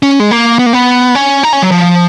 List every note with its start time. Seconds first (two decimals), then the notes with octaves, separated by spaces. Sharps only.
0.03 C#4
0.20 G#3
0.31 A#3
0.59 B3
0.66 A#3
0.73 B3
1.15 C#4
1.43 D#4
1.53 C#4
1.62 F#3
1.71 F3